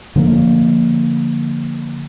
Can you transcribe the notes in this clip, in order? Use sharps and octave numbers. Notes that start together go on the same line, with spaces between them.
D3 F3 A3 A#3